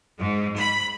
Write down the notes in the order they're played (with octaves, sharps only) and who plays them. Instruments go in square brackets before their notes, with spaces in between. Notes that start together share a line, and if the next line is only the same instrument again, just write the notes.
[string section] G#2
B5